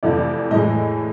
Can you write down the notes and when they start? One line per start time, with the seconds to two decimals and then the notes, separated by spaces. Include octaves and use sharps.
0.03 F2 C3 E3 A3 D5
0.51 A2 E3 G#3 D#5